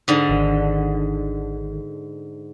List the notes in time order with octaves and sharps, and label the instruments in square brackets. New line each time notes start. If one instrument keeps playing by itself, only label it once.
[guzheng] G#2 D3
[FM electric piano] G#1 D#3